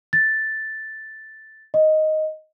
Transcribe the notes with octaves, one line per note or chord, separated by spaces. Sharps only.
A6
D#5